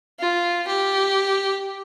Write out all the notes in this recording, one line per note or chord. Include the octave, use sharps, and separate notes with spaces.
F4
G4